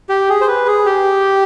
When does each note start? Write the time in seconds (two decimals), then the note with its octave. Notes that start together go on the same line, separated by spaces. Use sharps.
0.09 G4
0.29 G#4
0.41 C5
0.48 B4
0.67 G#4
0.86 G4